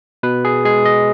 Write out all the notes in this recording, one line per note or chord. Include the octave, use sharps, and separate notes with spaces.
B2 B4
G#4
G#3 G#4
D#5